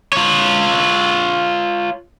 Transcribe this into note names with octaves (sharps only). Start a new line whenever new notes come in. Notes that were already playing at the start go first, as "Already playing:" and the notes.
F4 C#5